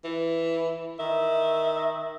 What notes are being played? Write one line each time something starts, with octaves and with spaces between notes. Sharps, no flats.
E3
D#3 E5